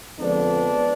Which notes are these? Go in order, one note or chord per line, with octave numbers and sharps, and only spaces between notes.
F2 D3 F3 G#3 B3 D4